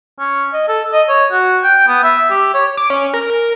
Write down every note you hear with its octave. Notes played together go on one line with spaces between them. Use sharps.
C#4
D#5
A4
D#5
C#5
F#4
G5
B3
E5
G4
C#5
D6
C#4
A#4
A#4